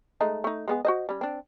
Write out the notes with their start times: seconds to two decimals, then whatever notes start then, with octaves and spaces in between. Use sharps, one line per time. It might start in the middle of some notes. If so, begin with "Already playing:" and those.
0.21 G#3 A3 D#4
0.44 A3 D#4
0.68 G#3 B3 G#4
0.85 F#4 C5 D#5
1.09 G3 C#4
1.21 C4 D4